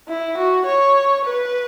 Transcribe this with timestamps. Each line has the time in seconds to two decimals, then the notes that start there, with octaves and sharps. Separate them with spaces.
0.08 E4
0.38 F#4
0.66 C#5
1.25 B4